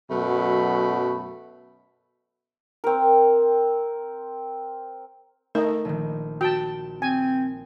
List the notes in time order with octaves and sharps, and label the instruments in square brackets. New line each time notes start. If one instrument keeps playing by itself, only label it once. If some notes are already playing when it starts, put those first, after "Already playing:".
[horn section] F#2 B2 F#3 A3 F#4 B5
[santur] C4 A#4
[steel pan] A3 D#4 [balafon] A#4 [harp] E7
[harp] A#1 D#3
[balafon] F#4 [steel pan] G5 A5
[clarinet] C4 [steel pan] G#5